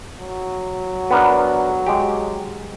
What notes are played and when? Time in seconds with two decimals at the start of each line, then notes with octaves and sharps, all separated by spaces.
0.20 F#3
1.11 B3 D4 A#4
1.87 G#3 G4